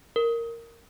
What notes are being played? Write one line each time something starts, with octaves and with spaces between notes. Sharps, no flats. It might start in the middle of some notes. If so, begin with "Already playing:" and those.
A#4